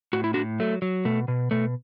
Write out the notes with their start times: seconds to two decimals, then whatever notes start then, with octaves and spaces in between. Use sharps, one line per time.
0.13 A2 F#4
0.24 E4
0.34 A2 D4 F#4
0.60 F#3 A3
0.82 F#3
1.05 B2 A3
1.28 B2
1.51 B2 A3